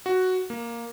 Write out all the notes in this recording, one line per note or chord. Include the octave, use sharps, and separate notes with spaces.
F#4
A#3